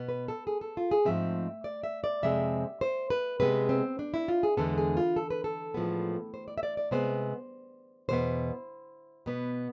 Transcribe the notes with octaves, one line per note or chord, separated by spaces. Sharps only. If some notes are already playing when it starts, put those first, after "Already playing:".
Already playing: B2 B3
B4
A4
G#4
A4
F4
G#4
G#2 F3 A3 C4 E5
D5
E5
D5
F2 C3 G#3 C4 E5
C5
B4
C3 G#3 B3 B4
C4
D4
E4
F4
G#4
E2 D3 G#3 B3 A4
G#4
F4
A4
B4
A4
A2 F3 G#3 B3
C5
D5
E5
D5
D5
C3 G#3 B3 C5
E2 B2 B3 C5
B2 B3